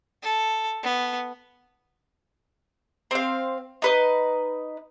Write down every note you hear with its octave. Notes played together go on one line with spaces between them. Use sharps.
A4
B3
C4 F5
D#4 B4 D#5